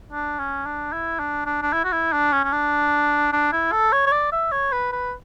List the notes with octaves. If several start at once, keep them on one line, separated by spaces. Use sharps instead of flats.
D4
C#4
D4
E4
D4
D4
D4
E4
F#4
E4
D4
C#4
C#4
D4
D4
E4
A4
C#5
C#5
D5
E5
C#5
B4
B4